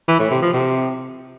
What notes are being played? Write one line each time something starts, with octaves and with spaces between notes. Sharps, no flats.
E3
A2
C3
F3
C3